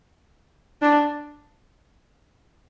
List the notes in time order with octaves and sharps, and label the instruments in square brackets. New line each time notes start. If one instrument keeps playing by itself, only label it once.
[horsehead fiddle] D4